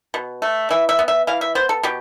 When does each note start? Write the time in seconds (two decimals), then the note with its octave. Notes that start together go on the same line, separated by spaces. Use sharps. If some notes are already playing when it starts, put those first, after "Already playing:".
0.14 B2
0.42 A3
0.70 E3 E5
0.89 E5
0.99 B3
1.08 E5
1.27 E3 F5
1.41 E5
1.55 B3 C5
1.69 A4
1.83 B2 G4